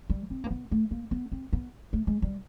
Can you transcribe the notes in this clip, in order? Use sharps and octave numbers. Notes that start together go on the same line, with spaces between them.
G3
C4
A#3
B3
A3
A#3
B3
C4
B3
A3
G#3
G3